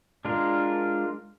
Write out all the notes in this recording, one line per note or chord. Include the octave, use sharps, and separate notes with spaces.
G#3 D4 F4 A#4